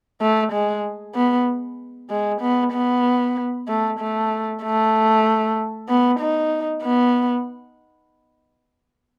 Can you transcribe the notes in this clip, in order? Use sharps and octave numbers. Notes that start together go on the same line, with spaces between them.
A3
G#3
B3
G#3
B3
B3
A3
A3
A3
B3
D#4
B3